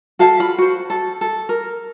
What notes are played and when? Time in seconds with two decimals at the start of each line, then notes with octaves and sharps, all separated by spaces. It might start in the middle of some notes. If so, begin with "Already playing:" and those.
0.19 F#4 A4 F5 A5
0.39 F4 B5
0.58 F#4 C5
0.90 A4
1.21 A4
1.49 A#4